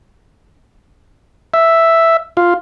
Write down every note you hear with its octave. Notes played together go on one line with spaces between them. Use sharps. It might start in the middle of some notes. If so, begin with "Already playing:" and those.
E5
F4